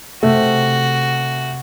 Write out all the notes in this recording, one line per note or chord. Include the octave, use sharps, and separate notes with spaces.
C3 A3 F#4